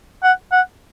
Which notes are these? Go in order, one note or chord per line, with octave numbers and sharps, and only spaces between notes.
F#5
F#5